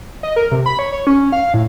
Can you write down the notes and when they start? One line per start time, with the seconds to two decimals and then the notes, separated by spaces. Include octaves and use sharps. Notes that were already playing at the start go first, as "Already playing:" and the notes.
0.23 D#5
0.36 A#4
0.52 C3
0.66 B5
0.79 C#5
0.92 C#5
1.07 C#4
1.32 F5
1.54 A2